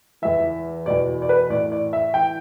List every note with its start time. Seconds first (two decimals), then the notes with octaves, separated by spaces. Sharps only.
0.22 E2 E3 E5
0.86 E2 B2 D5
1.22 D5
1.29 B4
1.50 A2 E3 D5
1.72 D5
1.93 E5
2.14 E3 G5